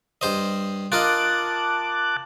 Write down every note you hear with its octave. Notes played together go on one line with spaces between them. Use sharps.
G2 C5 D#5
F4 A#4 D#5 A5 D6 F#6